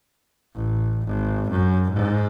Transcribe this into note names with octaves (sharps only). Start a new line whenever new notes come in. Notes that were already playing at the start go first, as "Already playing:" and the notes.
A1
G#1
F#2
G#2